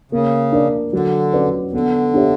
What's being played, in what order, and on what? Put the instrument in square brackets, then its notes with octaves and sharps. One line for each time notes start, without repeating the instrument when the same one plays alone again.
[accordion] C#3 [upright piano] A#3
[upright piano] D4 A#4 D5
[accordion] D3 [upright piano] F#3
[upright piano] C#4 F#4 B4 D5
[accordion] D3 [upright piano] B3
[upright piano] D4 G4 C#5 E5